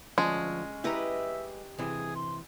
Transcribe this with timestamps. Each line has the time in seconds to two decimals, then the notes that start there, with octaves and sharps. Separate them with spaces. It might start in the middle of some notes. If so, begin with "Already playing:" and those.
0.18 D2 F3 G#3 C#4
0.84 E4 G4 B4 D#5 E5 A#5
1.78 C3 E3 G#4
2.15 C6